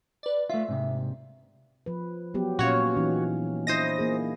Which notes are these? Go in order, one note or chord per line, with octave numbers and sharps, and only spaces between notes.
B4 D5
A3 F4 E5
G#2 C3
F3 B4
F#3 B3 G4
A#2 C#4 F#4 C#5 F5
E3 C#4 D#4
D4 E4 C5 D#5 D#6 A#6
A#3 G#4